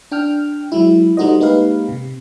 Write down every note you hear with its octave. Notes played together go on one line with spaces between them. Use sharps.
D4 G5 F6
F#3 G#3 E4
G3 A3 D#4 F#4 C5 D#5
G#3 A#3 D#4 G4 B4 F5
C3